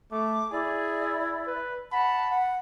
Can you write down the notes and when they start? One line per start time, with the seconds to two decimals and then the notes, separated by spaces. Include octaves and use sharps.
0.12 A3 D6
0.51 E4 G#4 D5
1.47 B4
1.92 F#5 A5 B5
2.29 F#5